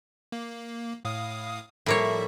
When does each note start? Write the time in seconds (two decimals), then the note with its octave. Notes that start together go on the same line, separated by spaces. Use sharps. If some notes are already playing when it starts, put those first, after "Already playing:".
0.32 A#3
1.05 A2 F5 D#6
1.86 A2 F3 G3 A#3 C#5 E5